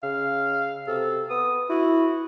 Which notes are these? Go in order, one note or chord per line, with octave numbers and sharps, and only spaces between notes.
C#3 F5
C3 A4
B3 D#6
E4 F#4